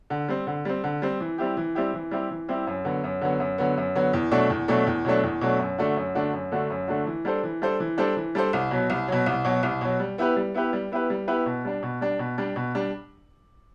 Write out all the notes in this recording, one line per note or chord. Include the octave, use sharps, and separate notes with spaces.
D3
G3 C4
D3
G3 C4
D3
G3 C4
E3
G3 C4 E4 G4
E3
G3 C4 E4 G4
E3
G3 C4 E4 G4
E3
G3 C4 E4 G4
F#2
D3 F#3 B3
F#2
D3 F#3 B3
F#2
D3 F#3 B3
F#2
D3 F#3 B3
E2
B2 F#3 A3 D4
E2
B2 F#3 A3 D4
E2
B2 F#3 A3 D4
E2
B2 F#3 A3 D4
F#2
D3 A3 D4 F#4
F#2
D3 A3 D4 F#4
F#2
D3 A3 D4 F#4
F#2
D3 A3 D4 F#4
E3
G3 D4 A4 C5
E3
G3 D4 A4 C5
E3
G3 D4 A4 C5
E3
G3 D4 A4 C5
C2
B2 F#3
C2
B2 F#3
C2
B2 F#3
C2
B2 F#3
G3
B3 E4 G4 B4
G3
B3 E4 G4 B4
G3
B3 E4 G4 B4
G3
B3 E4 G4 B4
B2
G3 D4
B2
G3 D4
B2
G3 D4
B2
G3 D4